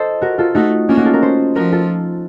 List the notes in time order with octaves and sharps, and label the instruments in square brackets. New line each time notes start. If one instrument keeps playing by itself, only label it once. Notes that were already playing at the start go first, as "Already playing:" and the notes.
Already playing: [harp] F4 A4 C5 D#5
F#4 A#4
F4 A4
[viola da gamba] A3 [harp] D#4 F#4
[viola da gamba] A#3 [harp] C#4 F4
[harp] D#4 F#4
F4 A4
F#4 A#4
A4 C5
[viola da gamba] F3 [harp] F#4 A#4
[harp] F4 A4